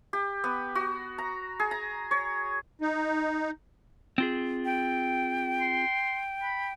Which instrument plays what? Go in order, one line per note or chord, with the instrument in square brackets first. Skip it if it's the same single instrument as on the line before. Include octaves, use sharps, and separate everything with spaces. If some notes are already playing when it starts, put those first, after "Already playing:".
[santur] G4
B3
F#4
A#5
G#4
A#5
C#5
[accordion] D#4
[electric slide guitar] C4 F4 G#4
[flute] G5
[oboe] C6
B5